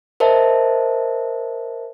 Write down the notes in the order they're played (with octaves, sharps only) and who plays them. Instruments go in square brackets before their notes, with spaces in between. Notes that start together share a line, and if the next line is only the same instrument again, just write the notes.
[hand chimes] A#4 C5 D#5 E5 A5